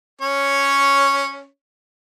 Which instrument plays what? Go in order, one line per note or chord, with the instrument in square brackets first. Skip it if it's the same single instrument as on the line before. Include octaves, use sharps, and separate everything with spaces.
[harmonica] C#4 C#5